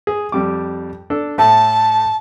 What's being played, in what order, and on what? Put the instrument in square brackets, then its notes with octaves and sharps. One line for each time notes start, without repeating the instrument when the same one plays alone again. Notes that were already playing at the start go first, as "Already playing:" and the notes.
[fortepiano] G#4
F2 G3 D6
D4 A4
[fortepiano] A2 A3 [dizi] A5